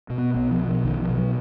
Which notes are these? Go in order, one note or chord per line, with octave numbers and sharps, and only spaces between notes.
B2
B3
B1 B3
F3
B2
F3
B1 D#3
F3
B2
F#3